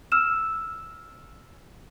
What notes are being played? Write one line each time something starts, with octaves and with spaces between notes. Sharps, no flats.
E6 F6 E7